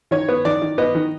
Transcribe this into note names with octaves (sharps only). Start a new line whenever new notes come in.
D#3 C#5
B3
D#3 D5
D#3
B3 D#5
D#3